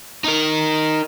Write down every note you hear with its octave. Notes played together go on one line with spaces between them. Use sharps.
D#4 A#4